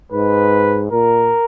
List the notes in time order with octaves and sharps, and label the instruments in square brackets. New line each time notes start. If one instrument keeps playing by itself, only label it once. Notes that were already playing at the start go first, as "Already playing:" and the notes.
[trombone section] G#2 [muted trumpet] B4
[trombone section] A#2 [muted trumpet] A#4